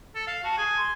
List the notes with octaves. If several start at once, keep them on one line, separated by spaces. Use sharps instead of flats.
A4
F5
F#4 A5
G#4 G#5
C6